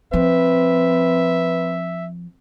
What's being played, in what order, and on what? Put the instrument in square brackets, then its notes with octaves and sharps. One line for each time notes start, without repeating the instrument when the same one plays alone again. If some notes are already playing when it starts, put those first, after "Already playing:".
[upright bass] F3 [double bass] C4 [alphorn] B4 [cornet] E5